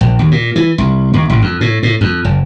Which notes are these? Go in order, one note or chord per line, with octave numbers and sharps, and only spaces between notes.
A#1
D#2
A#2
E3
C2
D#2
A1
F2
A2
A2
F2
F#1